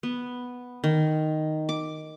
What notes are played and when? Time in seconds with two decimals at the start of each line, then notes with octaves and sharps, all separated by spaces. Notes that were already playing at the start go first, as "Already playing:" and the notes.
0.03 B3
0.84 D#3
1.69 D6